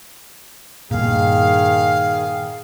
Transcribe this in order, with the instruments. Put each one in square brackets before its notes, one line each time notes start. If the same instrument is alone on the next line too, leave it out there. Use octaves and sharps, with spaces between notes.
[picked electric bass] G2 A#2 [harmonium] D#3 G#4 [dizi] F5